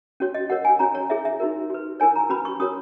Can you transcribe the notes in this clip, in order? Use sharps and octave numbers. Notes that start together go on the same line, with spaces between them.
C#4 F#4 C#5
D#5
F#4 A#4 C#5 F#5
G#5
C#4 F#4 C#5 A#5
C#5
E4 G#4 C#5 E5
E5
D#4 F#4 A#4
F#4 B4
E4 A#4 C#5 G#5
A#5
C#4 F#4 B4 B5
C#6
C#4 F#4 A#4 C#5 D#6